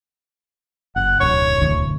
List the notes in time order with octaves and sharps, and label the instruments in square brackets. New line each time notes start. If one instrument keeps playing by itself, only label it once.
[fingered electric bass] F#1 [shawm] F#5
[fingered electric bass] D1 B1 F#2 [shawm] C#5
[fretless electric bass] D2